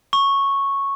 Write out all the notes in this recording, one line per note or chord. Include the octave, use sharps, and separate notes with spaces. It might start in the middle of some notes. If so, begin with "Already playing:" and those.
C#6